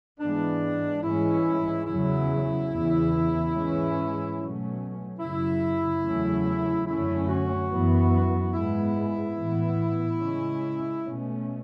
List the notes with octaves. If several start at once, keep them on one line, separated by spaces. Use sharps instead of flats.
G#2 E3 G#3 B3 D4
G#2 E3 G#3 C#4 E4
E2 C#3 F#3 C#4 E4
E2 C#3 E3
G#2 E3 G#3 C#4
B2 F#3 A3 C#4
F#2 C#3 F#3 E4
E2 C#3 F#3 A3 C#4
F#2 D3 A3 C#4 E4
F#4
F#2 E3 B3
G#2 G#3 B3 E4
A2 E3 B3
C#3 G#3 C#4
B2 A3 C#4